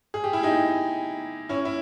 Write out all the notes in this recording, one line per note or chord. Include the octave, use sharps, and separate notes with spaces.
G#4
G4
E4
D#4 G4
C#4 E4
E4